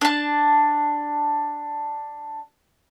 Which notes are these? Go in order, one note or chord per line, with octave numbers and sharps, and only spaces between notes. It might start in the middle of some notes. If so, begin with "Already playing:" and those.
D4 A5